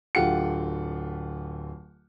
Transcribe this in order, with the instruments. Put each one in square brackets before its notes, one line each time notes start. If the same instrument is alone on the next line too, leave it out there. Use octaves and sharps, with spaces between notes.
[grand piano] D1 D3 F4 G4 F#5 C#7